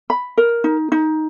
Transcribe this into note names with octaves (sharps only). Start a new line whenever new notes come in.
B5
A#4
D#4
D#4